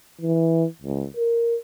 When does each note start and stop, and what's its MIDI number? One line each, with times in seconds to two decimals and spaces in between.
0.21 0.65 52
0.82 1.05 37
1.17 1.56 70